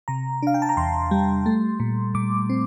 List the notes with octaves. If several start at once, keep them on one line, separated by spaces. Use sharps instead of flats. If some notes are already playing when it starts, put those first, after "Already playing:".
C3 A#5
D4 F5
G5
A5
A#5
E2 C6
G3
A3
A#2
A#2 D6
C4